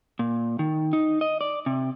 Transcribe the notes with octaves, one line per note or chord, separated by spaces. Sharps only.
A#2
D#3
D#4
D#5
D5
C3